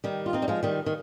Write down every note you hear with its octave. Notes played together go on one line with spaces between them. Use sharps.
D#3 G3
F4
C4 D#4
G3
F3 G#3
D#3 G3
D#3